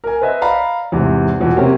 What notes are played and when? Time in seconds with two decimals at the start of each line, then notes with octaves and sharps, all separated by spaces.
0.04 A#4 G#5
0.22 B4 C5 D#5 E5
0.42 D5 F5 A#5 B5
0.92 E2 G#2 C3
1.39 E2 B2 F3
1.56 C3 F#3 A#3 C4 C#4 G4